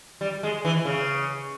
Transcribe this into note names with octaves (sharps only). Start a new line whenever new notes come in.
G3
G#3
E3
C#3